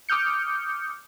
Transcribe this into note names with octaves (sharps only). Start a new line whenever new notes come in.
D6 D#6 F6 G6 C#7